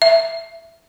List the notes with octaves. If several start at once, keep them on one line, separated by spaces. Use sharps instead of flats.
E5